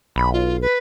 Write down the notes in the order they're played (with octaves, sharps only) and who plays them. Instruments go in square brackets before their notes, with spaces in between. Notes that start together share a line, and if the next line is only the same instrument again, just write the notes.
[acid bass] B1 [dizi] B5
[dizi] F4
B4